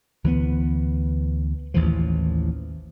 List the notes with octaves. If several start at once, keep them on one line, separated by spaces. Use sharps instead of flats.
D2 E3 F#3 B3
A1 D#2 E3 F3